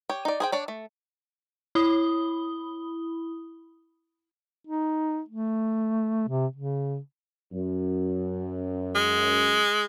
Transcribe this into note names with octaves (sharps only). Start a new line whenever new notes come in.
G4 C#5
D#4 D5
G#4 C5 G5
D4 C#5 D5
A3
E4 B5 D#6 G7
D#4
A3
C3
C#3
F#2
G#3